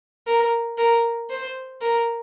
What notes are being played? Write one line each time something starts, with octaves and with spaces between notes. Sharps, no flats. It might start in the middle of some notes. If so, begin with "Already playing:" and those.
A#4
A#4
C5
A#4